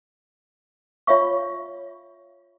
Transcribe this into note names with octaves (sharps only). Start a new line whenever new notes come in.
F4 C#5 E5 F5 C#6